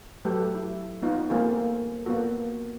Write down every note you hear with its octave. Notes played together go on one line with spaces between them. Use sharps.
F#3 A3 G4 A4 B4
E4
B3 D#4 F4
G3 A3 A#3 C4 F4 G#4
A#3 B3 F4 F#4 A4